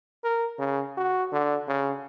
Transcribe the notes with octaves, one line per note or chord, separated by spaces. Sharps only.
A#4
C#3
F#4
D3
C#3